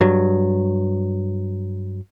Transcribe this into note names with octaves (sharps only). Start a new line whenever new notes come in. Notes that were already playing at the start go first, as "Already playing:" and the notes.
G2 F#3